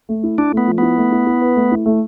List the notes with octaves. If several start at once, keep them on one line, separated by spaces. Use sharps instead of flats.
A3
E4
D4 E4
A3 B3
F3
B3 E4
A3
E4
E4
B4
A3
E4
A3